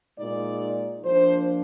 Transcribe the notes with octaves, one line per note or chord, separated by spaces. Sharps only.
A#2 G#3 D#4 D5
F3 A#3 D4 C5